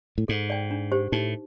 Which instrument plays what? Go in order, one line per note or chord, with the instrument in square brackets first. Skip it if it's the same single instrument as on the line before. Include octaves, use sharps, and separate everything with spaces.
[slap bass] A2
[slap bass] G#2 [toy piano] A4
[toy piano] D5 G5
D4
G4 C5
[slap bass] A2 [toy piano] D#4